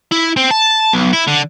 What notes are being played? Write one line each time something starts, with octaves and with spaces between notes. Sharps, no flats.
E4
C4
A5
B1
E4
D3